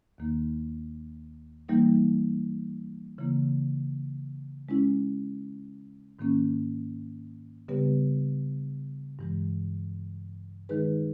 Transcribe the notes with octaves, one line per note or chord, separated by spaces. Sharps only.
D#2 D#3 A#3 D#4
E3 G3 A#3 D#4
C#3 E3 A#3 E4
G#3 C#4 E4
G#2 D#3 A#3 C#4
C#3 G3 B3 G4 B4
G2 E3 G#3
D#3 G#3 D#4 G#4 B4